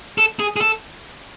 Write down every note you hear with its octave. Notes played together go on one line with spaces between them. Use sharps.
A4
G#4
G#4
A4